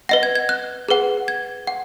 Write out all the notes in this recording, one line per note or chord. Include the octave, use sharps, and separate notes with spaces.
B4 D#5 F#5 A#6
G#6
G#6
F#6
G#4 B4 F#5
G#6
F#5